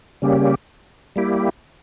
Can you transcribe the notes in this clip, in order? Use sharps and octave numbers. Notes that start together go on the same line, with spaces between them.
C#3 G3 A#3 C#4 G4
G3 A#3 E4 G4